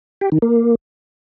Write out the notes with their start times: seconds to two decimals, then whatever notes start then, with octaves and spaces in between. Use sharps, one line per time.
0.21 G4
0.32 D#3
0.42 A#3